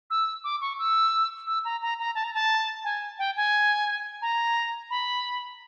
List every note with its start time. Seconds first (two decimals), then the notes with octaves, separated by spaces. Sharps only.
0.10 E6
0.44 D6
0.61 C#6
0.79 E6
1.47 E6
1.65 A#5
1.82 A#5
1.99 A#5
2.15 A5
2.24 A#5
2.34 A5
2.84 G#5
3.19 G5
3.36 G#5
4.22 A#5
4.90 B5